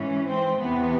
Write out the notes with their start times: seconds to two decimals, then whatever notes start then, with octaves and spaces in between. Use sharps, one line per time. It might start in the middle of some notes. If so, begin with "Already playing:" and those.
Already playing: G#2 E3 C#4
0.27 C4
0.59 E2 C3 E3 B3